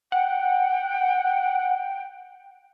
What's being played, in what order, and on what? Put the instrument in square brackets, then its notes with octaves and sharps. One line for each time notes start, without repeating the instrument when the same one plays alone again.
[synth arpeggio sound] F#5 [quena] G5